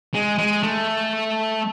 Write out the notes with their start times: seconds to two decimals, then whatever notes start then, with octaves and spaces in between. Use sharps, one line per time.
0.14 G#3
0.38 G#3
0.63 A3